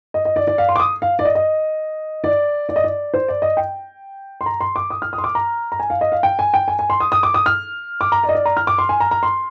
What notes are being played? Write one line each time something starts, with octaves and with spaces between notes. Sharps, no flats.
D#5
D#5
D5
D5
F5
C6
D6
D#6
F5
D5
D#5
D#5
D5
D5
D#5
D5
C5
D5
D#5
G5
C6
A#5
C6
D6
D#6
F6
D#6
C6
D6
A#5
A#5
G#5
F5
D#5
F5
G5
G#5
G5
G#5
G#5
C6
D#6
D#6
D6
D#6
F6
D6
A#5
D5
D#5
D5
A#5
F6
D6
C6
G#5
A#5
A#5
C6